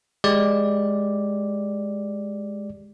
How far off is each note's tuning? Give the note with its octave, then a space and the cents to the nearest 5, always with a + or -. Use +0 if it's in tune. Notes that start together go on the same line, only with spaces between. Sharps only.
G#3 +0 G4 +0 D5 +0